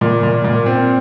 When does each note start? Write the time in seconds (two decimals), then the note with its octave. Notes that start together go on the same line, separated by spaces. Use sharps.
0.01 A#2 F4
0.23 A#2
0.44 A#2
0.66 C4